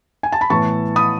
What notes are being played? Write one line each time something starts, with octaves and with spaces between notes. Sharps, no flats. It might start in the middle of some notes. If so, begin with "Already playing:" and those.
G#5
A5
B5
A2 E3 B3 A5 C#6
B5 D#6